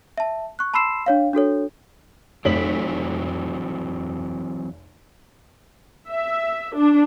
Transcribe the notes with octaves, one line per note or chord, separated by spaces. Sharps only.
E5 A5
C#6 F#6
A5 B5 C6 E6 C7 E7
D4 C#5 F5
D4 F#4 A4 C#5
F1 E3 F#3 C4 B6 F#7
E5
D4